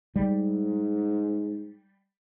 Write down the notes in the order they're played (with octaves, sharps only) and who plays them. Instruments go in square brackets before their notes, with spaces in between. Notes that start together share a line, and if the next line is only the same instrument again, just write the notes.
[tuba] G#2 [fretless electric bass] G3